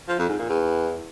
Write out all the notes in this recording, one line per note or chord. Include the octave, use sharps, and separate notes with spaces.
F3
F2
G#2
A#2
E2